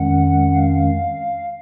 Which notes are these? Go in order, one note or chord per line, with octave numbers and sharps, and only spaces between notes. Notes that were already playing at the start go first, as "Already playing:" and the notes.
Already playing: F2 D#3 G#3 C#4 F#5
F5